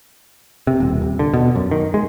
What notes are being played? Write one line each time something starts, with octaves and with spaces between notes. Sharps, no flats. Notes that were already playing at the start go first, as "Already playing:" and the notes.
C3
D#1
D#1
D3
B2
F#2
D#3
G#3